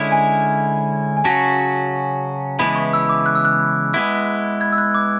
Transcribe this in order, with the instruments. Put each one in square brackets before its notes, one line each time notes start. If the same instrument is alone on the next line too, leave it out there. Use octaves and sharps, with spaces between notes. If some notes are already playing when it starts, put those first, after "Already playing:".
Already playing: [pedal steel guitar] D3 G#3 C#4 E4
[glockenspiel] G#5
G#5
[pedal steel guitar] C#3 F#3 C#4 F#4 [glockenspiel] A5
[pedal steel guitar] C#3 E3 G#3 B3 E4 [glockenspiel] B5
[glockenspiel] C#6
E6
D6
F#6
E6
F#6
[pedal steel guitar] G#3 B3 E4
[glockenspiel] G#6
E6
F#6
D6